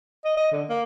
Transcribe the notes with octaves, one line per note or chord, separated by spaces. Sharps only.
D#5
D#5
D3
A#3